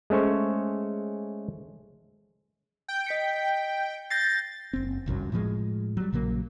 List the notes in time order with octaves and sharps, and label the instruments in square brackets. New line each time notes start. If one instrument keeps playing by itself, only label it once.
[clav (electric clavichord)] G#3 A3 C#4 C5 C#5
[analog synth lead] G5
[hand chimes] D#5 B6 C#7
[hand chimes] G6 A#6 C7 [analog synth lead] A6
[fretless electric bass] F#1 C4
G1 C2 F#2 F#3
A2 F3 F#3 G#3
F#3 G3
A#1 C#3 F#3 A#3